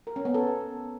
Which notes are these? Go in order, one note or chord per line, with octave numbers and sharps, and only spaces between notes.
A#4
C#4
B3
A4